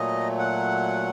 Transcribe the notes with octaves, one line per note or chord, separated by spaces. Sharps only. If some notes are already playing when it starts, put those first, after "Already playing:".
Already playing: A#2 F#3 A3 D#5
F#5